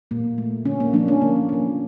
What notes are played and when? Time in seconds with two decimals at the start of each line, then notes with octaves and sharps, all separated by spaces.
0.11 A#2 A#3
0.38 A3
0.65 D3 C#4
0.80 A#3
0.93 F3 A#3 D4
1.08 C#4
1.21 D3 A#3
1.49 F3 A#3